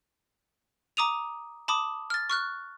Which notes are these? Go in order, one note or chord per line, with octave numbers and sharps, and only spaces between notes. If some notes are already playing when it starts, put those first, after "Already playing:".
A#5 D6 D#6 D#7 F7
A5 B5 D6 D#6
F6 A6
C#6 F6 F#6